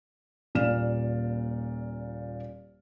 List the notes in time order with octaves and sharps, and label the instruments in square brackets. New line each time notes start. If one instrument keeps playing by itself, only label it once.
[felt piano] D#1 A#2 D5 F5 F6 E7